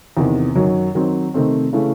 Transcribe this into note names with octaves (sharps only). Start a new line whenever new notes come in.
E2 C3 D#3
F#2 D#3 F#3
D#3 F#3 C4
C3 D#3 A3 C4
C#3 E3 A3